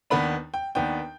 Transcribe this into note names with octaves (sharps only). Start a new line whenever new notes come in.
D#2 D#3 B3 D4 B5
G5
D#2 D#3 B3 D4 G5